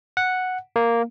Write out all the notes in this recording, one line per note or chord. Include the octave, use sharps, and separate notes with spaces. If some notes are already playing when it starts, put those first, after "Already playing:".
F#5
A#3